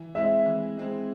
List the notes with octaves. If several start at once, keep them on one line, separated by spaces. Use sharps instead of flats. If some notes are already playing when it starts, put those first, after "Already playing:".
Already playing: E3
G#3 C4 E4 E5
E3
G#3 C4 E4